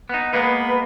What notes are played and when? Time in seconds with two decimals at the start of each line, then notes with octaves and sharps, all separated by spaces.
0.09 B3 D#4
0.33 G#3 A#3 B3 B4